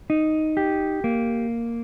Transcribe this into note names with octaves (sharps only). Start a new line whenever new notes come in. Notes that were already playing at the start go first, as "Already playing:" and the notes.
D#4
G4
A#3